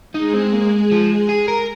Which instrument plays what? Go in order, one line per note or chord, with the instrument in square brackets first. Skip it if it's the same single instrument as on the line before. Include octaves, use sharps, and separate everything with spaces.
[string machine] G#3 G#4 [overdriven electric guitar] D#4
[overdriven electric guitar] C4
A#3
F3
G#4
A#4